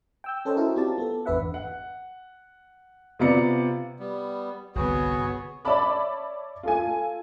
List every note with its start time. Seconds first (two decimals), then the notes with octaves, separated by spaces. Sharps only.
0.24 G5 E6 G6
0.45 C#4 A4 A#4 C5 C#5 D#5
0.57 E4 F#4 A#4
0.76 C4 F4 G4 D5 A5
0.98 B3 A4
1.26 G#1 E2 D4 B4 E5 F#5
1.54 F#5
3.19 C3 B3 F4 D5 A#5 C#7
3.99 G3 B3
4.75 G1 C2 B3 F#4 G#4 C#5
5.65 C#5 D5 E5 A5 B5 D6
6.63 F4 A4 G#5